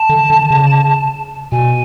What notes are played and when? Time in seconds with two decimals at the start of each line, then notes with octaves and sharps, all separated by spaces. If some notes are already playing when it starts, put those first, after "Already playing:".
Already playing: A5
0.09 D3
0.30 D3
0.50 C#3
1.52 B2 G#5